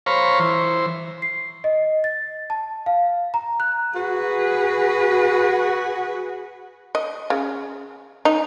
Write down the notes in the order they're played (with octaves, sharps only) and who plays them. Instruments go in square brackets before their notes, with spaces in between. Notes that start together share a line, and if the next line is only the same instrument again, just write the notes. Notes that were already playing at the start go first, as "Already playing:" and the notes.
[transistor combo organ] C5 C#5 F5 A#5 B5 C#6
E3 C5
[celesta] C7
D#5
A6
A5
F5
A#5
F#6
[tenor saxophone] F#4 [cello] G#4 B4
[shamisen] D#5
C#3
D#4